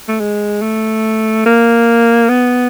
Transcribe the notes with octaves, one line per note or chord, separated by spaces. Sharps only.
A3
G#3
A3
A#3
B3